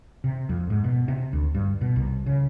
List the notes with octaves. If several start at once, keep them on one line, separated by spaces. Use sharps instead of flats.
C3
F2
G#2
B2
C3
D2
G2
B2
C2
C#3